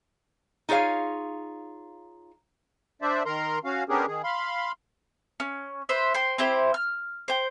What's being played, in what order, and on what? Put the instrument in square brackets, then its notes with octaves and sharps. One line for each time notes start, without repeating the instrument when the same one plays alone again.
[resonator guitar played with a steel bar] D#4 F4 G#4 C#5 F5
[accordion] D4 C5 D5 E5
D#3 A#4 A#5 C6
C#4 F#4 F5
B3 C#4 D4 G4 G#4 A#4
D#3 G#4
F5 B5 C6
[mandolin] C#4
B4 C5 E5
C5 G5 C6
C4 E4 G4 C5
F6
C5 G5